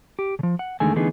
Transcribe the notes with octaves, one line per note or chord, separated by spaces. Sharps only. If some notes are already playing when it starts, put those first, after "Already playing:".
G4
C#3 F3
F#5
E2 D3 D#3 G#3 A3 G#5
D3 E3 A3 B3 D#4 G#4